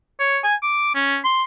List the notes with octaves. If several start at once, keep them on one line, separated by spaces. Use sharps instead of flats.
C#5
G#5
D6
C#4
C6